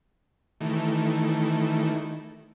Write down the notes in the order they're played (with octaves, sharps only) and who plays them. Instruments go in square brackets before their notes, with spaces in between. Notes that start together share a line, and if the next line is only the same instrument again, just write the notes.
[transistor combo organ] D#3 E3 A3